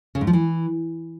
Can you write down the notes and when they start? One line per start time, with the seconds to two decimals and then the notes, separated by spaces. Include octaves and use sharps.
0.15 C#3
0.21 G#2
0.27 F3
0.33 E3